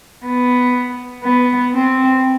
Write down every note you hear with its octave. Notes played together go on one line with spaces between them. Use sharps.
B3
B3
C4